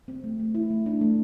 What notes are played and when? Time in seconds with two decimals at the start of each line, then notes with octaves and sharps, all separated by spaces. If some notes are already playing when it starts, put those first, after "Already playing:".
0.08 C4
0.24 A3
0.40 A3
0.55 E4
0.71 A3
0.86 D4
1.01 A3